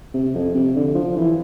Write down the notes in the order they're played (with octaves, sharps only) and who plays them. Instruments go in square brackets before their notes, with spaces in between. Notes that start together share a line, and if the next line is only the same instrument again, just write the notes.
[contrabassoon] C3
F2
C3
D3
F3
E3